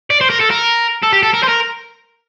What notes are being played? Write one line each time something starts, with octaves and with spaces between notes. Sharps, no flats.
D5
C5
A#4
A4
A#4
A4
G4
A4
A#4
C5
A#4